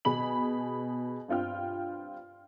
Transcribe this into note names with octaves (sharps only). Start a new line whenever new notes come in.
B2 G#4 B5 F#7
G2 C4 F4 G5 F6